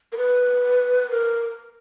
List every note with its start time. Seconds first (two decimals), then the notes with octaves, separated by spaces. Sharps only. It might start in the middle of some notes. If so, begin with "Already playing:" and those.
0.12 A#4
0.17 B4
1.11 A#4